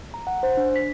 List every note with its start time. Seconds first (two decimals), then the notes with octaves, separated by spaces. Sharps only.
0.14 A#5
0.27 F#5
0.43 C5
0.57 D4
0.76 B6